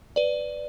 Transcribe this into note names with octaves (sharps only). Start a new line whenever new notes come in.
B4 D5